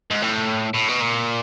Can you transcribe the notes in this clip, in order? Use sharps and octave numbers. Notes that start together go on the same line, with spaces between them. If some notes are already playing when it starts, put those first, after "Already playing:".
G#2
A2
A2
B2
A#2